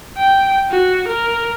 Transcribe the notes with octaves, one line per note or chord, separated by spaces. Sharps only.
G5
F#4
A#4